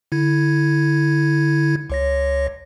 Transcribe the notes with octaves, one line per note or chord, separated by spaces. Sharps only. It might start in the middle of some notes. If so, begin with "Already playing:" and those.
D3 E4 G#6
C#2 C#5 A#6